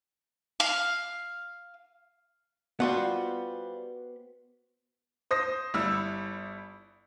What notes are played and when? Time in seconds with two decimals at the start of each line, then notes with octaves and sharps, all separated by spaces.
0.60 F5
2.80 G3 B3 F4 F#4 C5 F#5
5.31 C5 D#6 A#6
5.74 G1 G3 E4 E6